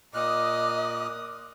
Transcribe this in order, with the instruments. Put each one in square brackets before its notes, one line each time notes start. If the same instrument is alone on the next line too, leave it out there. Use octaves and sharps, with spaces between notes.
[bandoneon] A#2 F6 F#6 [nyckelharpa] A#4 D#6 [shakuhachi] D#5 [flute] D6